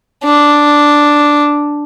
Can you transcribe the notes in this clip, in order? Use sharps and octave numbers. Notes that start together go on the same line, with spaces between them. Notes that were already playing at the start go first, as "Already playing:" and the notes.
D4